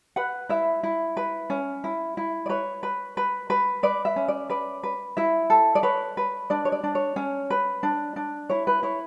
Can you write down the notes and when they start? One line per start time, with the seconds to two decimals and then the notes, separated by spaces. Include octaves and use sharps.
0.16 B4 F#5
0.49 E4 E5
0.83 E4
1.17 B4
1.50 C#4
1.84 E4
2.17 E4
2.46 D5
2.49 B4 C#5
2.83 B4
3.17 B4
3.50 B4
3.83 B4 D5
4.05 E5
4.16 C#4
4.28 D5
4.49 B4 D5
4.83 B4
5.17 E4 E5
5.50 A4
5.75 D5
5.83 B4 C#5
6.17 B4
6.50 D4 D5
6.65 C#5
6.72 D5
6.84 D4
6.95 C#5
7.16 C#4
7.50 B4
7.83 D4
8.16 D4
8.49 E4 C#5
8.67 B4
8.83 E4 C#5